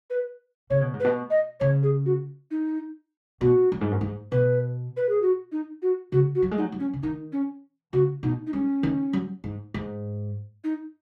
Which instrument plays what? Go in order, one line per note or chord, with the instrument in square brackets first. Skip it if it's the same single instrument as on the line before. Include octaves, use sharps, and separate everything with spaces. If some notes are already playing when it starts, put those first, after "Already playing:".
[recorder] B4
[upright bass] C#3 [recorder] C#5
[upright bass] B2
G#2
[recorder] B4
[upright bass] B2
[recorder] D#5
[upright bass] C#3 [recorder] C#5
[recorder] G#4
F#4
D#4
[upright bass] B2 [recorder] F#4
[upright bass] F#2
G#2
F#2
G#2
[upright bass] B2 [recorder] B4
[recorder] B4
G#4
F#4
D#4
F#4
[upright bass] C#3 [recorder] F#4
[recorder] F#4
[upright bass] F#3
G#3
[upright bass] F#3 [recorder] D#4
[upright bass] F#3
[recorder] C#4
[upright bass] C#3
[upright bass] D#3 [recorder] D#4
[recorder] C#4
[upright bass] C#3 [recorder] F#4
[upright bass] B2 [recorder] D#4
[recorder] D#4
[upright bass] G#3 [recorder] C#4
[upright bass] D#3
F#3
G#2
G#2
[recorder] D#4